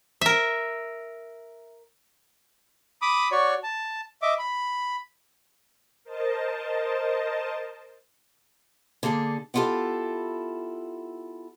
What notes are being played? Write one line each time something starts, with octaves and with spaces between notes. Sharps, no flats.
A#4 E5
B5 D6 D#6
F#4 C#5 D5 C#6
A5
D#5 E5 D6
B5
A#4 C5 D#5 A5
D3 A#3 G#4 A4
B3 E4 F4 G4 A4